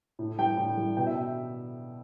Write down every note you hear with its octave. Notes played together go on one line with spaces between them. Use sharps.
A2
G3 G5
A2
G3
B2 G5
E5